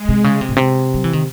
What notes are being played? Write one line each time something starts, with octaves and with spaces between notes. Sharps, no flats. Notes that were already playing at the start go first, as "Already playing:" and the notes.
Already playing: G#3
C3
C#3
C3
A2
C3
F#3
E3
D#3